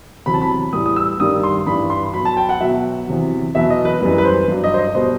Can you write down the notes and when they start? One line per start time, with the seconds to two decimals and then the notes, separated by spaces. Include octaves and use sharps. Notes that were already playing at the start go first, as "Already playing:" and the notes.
0.26 E2 C3 F#3 B5
0.34 A5
0.42 B5
0.73 A2 E3 G3 D#6
0.86 D#6
0.96 E6
1.20 G2 D#3 G3 D#6
1.43 C6
1.66 G2 E3 G3 B5
1.90 C6
2.14 B2 F#3 B5
2.25 A5
2.37 G5
2.49 F#5
2.60 B2 F#3 E5
3.07 E2 C3 F#3
3.55 E2 B2 F#3 E5
3.70 D#5
3.85 B4
4.01 F#2 E3 G3 B4
4.18 B4
4.25 C5
4.48 G2 F#3
4.64 D#5
4.74 C5
4.79 D#5
4.94 B2 G3 C5